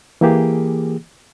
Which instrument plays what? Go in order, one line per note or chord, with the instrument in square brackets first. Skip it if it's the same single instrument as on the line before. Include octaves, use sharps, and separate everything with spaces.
[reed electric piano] E3 A#3 G4 G#4